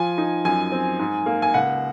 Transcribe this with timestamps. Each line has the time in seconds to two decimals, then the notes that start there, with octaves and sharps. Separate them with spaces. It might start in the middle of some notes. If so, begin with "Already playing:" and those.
Already playing: F3 G#5
0.18 D#4
0.45 F#2 G#5
0.72 C4
0.99 G#2
1.26 A#3
1.42 G#5
1.54 C#2 F#5